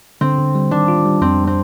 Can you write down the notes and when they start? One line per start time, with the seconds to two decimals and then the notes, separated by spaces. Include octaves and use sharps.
0.21 D3 C4
0.38 D3
0.55 G3
0.71 D#3 D4
0.88 F4
1.05 G3
1.21 F2 C4
1.47 C4